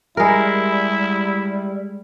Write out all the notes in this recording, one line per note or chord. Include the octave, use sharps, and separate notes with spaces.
G3 G#3 E4 A#4